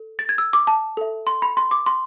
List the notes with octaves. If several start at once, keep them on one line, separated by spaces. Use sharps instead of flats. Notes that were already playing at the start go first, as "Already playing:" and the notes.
Already playing: A4
A6
G#6
E6
D6
A5
A4 E5
C6
B5
C6
D6
C6